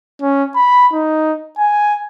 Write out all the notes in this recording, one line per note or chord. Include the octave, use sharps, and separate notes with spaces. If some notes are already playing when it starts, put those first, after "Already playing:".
C#4
B5
D#4
G#5